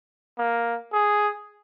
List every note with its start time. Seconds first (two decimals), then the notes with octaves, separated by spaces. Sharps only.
0.38 A#3
0.93 G#4